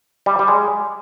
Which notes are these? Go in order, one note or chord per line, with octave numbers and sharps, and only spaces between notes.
G3
G3
G#3